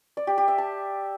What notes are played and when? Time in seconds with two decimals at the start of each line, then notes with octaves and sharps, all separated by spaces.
0.17 D5
0.27 G4
0.38 G4
0.48 E5
0.58 A5